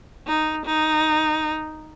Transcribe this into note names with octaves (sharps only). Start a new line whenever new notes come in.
D#4
D#4